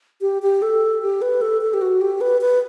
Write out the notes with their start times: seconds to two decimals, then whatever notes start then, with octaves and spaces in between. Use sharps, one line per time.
0.21 G4
0.42 G4
0.62 A4
1.02 G4
1.22 B4
1.41 A4
1.61 A4
1.74 G4
1.82 F#4
2.01 G4
2.21 B4
2.41 B4